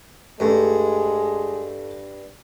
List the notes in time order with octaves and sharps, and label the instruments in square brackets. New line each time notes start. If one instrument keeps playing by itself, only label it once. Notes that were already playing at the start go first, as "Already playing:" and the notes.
[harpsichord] G2 [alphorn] G#3 [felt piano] A3